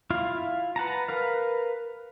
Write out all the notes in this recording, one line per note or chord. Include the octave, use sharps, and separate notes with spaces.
E4 F4 F5
B4 F#5 A5 A#5
A#4 B4 F5